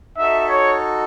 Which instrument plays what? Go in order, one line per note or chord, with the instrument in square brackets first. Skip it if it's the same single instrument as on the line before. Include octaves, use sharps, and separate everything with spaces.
[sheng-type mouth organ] D#4 F#4 A4 [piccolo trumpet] E5
[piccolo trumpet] C#5